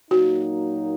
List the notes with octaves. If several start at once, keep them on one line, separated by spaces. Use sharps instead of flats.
A#2 F#3 A#3 D#4 F#4